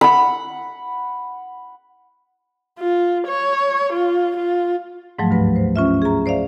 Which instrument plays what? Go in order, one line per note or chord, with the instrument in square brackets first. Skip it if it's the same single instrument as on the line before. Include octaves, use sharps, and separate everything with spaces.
[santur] F#5 B5
[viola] F4
C#5
F4
F4
[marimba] G#2 F3 F#3 A3
D2 G2 B4
C5
C#4 F4 E5
G#4 A#5
C5 D5 E5 F5